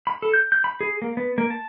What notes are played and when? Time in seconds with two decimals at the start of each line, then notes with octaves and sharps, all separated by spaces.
0.07 B5
0.22 A4
0.33 G6
0.52 G6
0.64 B5
0.81 G#4
1.02 A#3
1.17 B3
1.38 A#3
1.50 A5